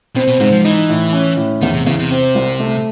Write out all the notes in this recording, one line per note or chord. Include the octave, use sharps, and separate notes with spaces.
B2 C4
B2
G#2 C3
F3
E3 D#4
A2
C#4
A2
E2 D#3
C3
E2 C#3
C3
C4
C2
A3